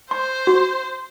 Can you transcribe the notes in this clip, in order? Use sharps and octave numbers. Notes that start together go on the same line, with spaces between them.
C5 C6
F#4